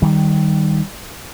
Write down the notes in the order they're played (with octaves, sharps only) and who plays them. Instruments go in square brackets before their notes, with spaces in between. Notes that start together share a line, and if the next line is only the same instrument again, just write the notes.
[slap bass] D#3 G3